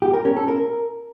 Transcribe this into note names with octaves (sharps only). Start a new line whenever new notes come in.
G4
A#4
C#4
A4
A#4